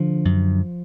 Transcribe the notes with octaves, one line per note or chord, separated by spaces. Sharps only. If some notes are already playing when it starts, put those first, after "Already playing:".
Already playing: D3 F3
F#2